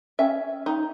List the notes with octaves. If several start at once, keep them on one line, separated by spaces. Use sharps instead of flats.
C#4 E5
D#4